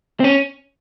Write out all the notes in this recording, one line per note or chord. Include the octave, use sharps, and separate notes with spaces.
C4
C#4